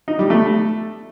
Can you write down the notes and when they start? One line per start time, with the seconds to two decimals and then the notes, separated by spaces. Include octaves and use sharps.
0.08 D#4
0.19 G3
0.30 A3